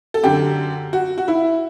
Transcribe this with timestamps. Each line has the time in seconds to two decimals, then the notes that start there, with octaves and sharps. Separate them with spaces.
0.14 A4
0.23 F#2 D3 G4
0.93 F#4
1.18 F#4
1.28 E4